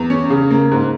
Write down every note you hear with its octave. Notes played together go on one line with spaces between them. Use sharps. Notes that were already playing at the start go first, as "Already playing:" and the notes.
Already playing: E2
C#4
C#3
A#3
G#2